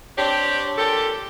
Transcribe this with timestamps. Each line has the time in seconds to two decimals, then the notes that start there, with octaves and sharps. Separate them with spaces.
0.18 C4 D4 G4 C#5
0.78 A#2 G4 A4